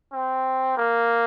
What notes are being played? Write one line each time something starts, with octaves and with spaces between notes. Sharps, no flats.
C4
A#3